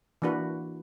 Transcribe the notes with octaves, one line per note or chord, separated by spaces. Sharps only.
E3 A#3 D4 F#4 B4